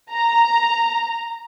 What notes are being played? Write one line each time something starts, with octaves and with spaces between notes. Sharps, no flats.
A#5